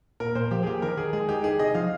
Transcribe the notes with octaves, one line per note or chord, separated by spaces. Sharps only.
A#2 A#4
A#2 C5
F3 G4
G#4
A#3 G4
D#3 A#4
D#3 G#4
G#3 G#4
D#4 G4
D#4 G#4
C3 D#5
F3 F5